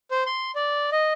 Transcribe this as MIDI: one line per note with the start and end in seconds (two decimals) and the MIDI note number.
0.11 0.23 72
0.26 0.51 84
0.55 0.90 74
0.92 1.13 75